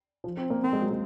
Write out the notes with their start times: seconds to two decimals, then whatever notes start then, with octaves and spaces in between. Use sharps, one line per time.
0.24 F3
0.37 C4
0.50 A#3
0.64 A#3 C4
0.73 G#3
0.82 F#3
0.91 G#3